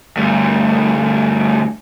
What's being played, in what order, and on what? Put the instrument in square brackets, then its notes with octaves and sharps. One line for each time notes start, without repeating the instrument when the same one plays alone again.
[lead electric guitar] D2 G2